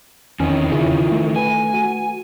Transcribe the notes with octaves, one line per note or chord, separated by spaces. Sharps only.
E2 D#3 E3 C4 C#4
C#3 C#4 E4 F4
A3
B4 G#5
F#4